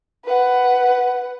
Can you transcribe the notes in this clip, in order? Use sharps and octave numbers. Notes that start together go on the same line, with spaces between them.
B4 F#5